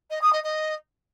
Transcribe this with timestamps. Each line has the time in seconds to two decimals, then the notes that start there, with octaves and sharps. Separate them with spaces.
0.10 D#5
0.21 D#6
0.32 D#5
0.43 D#5